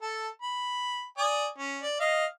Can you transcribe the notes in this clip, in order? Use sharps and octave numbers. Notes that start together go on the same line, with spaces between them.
A4 A5
B5
D5 G#5 D#6
C#4
D5
D#5 F5